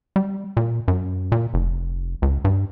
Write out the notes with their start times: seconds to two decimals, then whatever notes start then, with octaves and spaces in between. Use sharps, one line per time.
0.16 G3
0.57 A#2
0.88 F#2
1.32 A#2
1.54 F1
2.22 C#2
2.45 G2